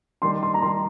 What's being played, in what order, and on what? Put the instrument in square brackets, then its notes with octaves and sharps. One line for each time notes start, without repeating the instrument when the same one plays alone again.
[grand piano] D#3 G3 D#4 [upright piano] C6
[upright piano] C6
A#5
[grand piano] D#3 G3 D#4 [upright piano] C6